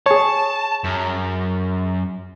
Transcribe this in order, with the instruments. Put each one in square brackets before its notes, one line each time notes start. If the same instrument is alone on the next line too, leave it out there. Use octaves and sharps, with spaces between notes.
[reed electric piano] G#4 C#5 [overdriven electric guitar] A5
[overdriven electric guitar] F#2